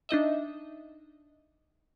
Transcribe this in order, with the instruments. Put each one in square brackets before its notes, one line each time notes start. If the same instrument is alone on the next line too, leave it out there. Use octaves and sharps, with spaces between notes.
[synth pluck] D4 D#4 D#5 E5